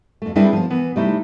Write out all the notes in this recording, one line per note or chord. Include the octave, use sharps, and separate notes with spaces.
F2 A3
G3 C4 D4 E4 G#4 B4
F3 B3
E3 B3
C3 G3 A3 D#4 E4